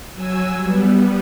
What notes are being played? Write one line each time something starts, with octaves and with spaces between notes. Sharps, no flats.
F#3 G#5 E6
G3 B3